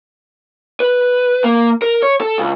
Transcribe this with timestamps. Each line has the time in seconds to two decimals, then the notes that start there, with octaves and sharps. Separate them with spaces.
0.80 B4
1.44 A#3
1.82 A#4
2.02 C#5
2.21 A4
2.38 C#2